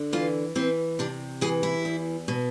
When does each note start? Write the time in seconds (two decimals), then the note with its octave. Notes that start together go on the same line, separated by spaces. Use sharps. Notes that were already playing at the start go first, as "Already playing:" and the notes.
Already playing: D3
0.13 E3 F4
0.55 E3 C4
0.99 C3 D4
1.41 E3 G#4
1.63 E4
1.85 E2
2.28 B2